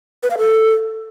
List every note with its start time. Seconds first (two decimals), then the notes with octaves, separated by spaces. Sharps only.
0.23 B4
0.30 F5
0.38 A4